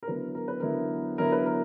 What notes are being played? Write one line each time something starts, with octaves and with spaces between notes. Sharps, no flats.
A#4
D3 F#3 B3 E4 B4
A#4
B4
D3 F#3 B3 E4 A#4
D3 F#3 B3 E4 A#4
B4
A#4